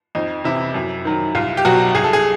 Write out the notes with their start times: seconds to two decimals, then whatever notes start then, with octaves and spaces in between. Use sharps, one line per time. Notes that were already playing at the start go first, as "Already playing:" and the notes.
0.15 F2 D#4
0.44 C3 E3 E4
0.74 F#2
1.05 D#3 F#3
1.35 C2 F4
1.57 G4
1.65 B2 F#3 F#4
1.95 C2 G#4
2.04 A4
2.13 G#4